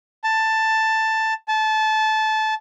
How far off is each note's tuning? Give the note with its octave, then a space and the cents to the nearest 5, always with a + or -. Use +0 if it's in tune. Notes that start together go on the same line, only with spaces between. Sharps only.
A5 +10
A5 -20